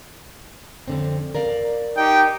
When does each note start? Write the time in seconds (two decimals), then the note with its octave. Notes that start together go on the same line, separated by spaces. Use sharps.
0.88 F2 D3 C4
1.35 A#4 D5 F5
1.97 D#4 G4 G5